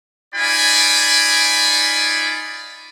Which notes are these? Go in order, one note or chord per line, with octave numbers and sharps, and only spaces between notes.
D#4 F4 D5 G#5 B5